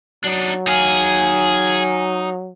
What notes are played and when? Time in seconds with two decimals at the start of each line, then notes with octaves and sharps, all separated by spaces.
0.24 F#3 D4 D#4
0.67 D#4 G#4 F5 G#5